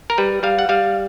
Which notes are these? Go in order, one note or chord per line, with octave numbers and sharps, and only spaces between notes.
A#4
G3 B4
G3 F5
F#5
G3 F5